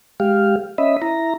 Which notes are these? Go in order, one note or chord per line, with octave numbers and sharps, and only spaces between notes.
G#3 G4 F5
C#4 D#5 E5 B5
E4 A#5